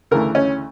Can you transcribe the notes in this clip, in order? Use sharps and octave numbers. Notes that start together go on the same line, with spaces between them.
D2 C#3 E3 A3 A#4
C#4